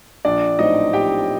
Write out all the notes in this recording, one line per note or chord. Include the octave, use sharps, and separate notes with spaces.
A#1 D4 D5
A2 F#3 C4 D#4 D#5
A#1 G4 G5